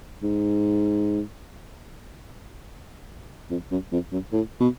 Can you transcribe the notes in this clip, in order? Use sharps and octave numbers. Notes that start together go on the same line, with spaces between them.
G#2
F2
F#2
F2
F#2
A2
B2